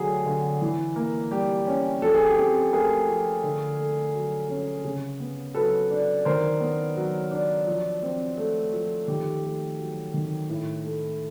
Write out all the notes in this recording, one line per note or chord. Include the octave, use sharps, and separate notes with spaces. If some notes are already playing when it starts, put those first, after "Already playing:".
Already playing: D3 F#3 A3 G4 G#4
D3
E3
A#3
G3 G4
C#4
F3 A4
G#4
G4
C4 G#4
A3 G#4 A#4
F3
D3
A3
F#3
C#4
C#3
B3
F#3 A4 B4
D4
D#3 A#4 C5
B3
F#3
D4
F3
C4
A3
F3
D#3 G4
A3
F#3
D#3
A2
A3